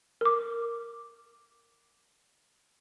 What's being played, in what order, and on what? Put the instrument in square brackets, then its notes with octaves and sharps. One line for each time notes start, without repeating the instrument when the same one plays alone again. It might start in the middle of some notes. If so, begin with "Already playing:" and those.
[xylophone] A#4 D6